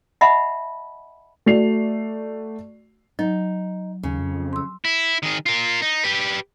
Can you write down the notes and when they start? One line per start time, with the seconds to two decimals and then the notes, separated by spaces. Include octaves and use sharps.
0.21 D#5 E5 F#5 A5 B5
1.46 A3 F#4 D5 C7 F7
3.19 F#3 D#4
4.03 D#2 C#3
4.19 F2
4.53 C6 E6
4.85 E4
5.23 D#3 G#4
5.46 F4 A#4
5.82 D#4
6.04 G4 B4